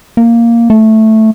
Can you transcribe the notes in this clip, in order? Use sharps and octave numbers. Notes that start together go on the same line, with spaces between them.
A#3
A3